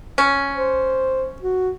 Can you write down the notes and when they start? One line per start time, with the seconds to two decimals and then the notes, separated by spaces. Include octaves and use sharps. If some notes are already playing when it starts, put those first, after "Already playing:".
0.18 C#4
0.55 C5
1.42 F#4